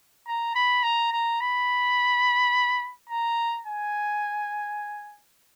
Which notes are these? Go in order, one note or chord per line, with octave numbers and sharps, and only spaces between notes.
A#5
B5
A#5
A#5
B5
A#5
G#5